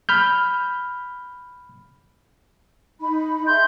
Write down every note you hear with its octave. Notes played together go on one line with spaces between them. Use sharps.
B5 F6 G6
D#4 B5
G#4 E5 C6 G6